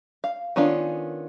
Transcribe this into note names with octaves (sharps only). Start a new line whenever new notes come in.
F5
D#3 B3 C#4 D4 F4